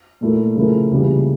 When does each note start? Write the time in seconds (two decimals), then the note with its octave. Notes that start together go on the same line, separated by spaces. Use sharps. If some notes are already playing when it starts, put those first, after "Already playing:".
0.21 A#2 A3 E4 A#4
0.56 C#3 F3 A3 E4 A#4
0.90 C#2 C#3 E3 G3 A#3